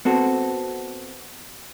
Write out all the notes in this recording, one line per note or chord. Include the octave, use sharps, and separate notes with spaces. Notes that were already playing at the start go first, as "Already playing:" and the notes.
B3 C4 F#4 A4